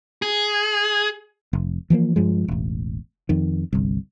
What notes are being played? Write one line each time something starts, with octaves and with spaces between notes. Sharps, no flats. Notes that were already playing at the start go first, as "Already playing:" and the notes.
G#4
F1
E3 F3 A3 A#3
G2 F3 G#3
E1 A1
F2 D#3
G1 C2